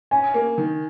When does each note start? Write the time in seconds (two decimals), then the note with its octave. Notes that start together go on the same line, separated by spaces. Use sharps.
0.11 C#4 G#5
0.34 A#3
0.58 D#3